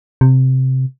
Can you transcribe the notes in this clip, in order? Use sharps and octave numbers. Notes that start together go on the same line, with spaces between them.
C3